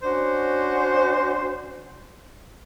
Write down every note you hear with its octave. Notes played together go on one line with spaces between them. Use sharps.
C#4 D4 F#4 C5